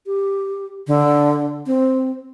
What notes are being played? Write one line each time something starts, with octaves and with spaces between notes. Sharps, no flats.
G4
D3
C4